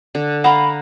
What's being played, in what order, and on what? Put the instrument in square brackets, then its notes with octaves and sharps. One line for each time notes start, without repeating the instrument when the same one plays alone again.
[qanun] D3
[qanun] F5 A#5 [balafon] F#5 [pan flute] B5